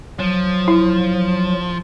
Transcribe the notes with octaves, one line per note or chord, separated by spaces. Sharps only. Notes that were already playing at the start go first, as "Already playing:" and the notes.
F3 F#3
E4